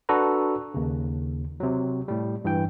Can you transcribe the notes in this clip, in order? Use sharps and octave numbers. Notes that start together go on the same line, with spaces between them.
D4 F#4 A4 B4 A#5
D#2 C#3
C3 F#3
A2 G3
G2 E3 G5